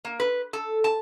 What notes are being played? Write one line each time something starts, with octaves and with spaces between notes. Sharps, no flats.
A#3
B4
A4
A5